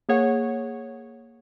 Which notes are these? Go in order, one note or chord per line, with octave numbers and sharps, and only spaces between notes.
A#3 G#4 C#5 F#5